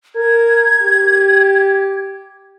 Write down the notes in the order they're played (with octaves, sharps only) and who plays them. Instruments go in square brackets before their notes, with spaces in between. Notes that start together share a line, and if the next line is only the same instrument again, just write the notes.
[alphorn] A#4 [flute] G#6
[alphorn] G4